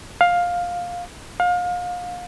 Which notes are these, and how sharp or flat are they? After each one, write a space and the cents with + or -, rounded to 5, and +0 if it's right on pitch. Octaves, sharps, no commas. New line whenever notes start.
F5 +10
F5 +30